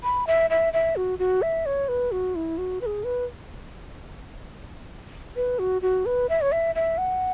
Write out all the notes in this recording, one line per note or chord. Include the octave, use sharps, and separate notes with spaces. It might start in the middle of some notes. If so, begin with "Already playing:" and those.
B5
E5
E5
E5
F#4
F#4
E5
C#5
B4
F#4
E4
F#4
B4
G#4
B4
B4
F#4
F#4
B4
E5
C#5
E5
E5
F#5